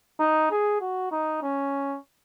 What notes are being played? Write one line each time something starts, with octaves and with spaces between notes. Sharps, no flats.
D#4
G#4
F#4
D#4
C#4